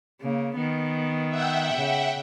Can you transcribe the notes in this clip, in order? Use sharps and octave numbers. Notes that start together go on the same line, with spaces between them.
C#3 A#3
D#3 B3
E5 F#5 G5
C#3